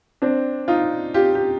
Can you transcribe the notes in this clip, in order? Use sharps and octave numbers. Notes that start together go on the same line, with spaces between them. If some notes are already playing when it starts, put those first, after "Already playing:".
C4 D4
D#4 F4
F4 G4
G4